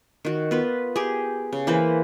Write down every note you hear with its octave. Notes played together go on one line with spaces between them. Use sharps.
D#3 F#4
B3 F4 B4
G4 G#4
C#3
E3 A#3 B4 C5